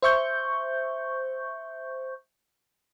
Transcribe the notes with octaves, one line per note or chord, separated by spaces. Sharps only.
C5 E5 C#6 G6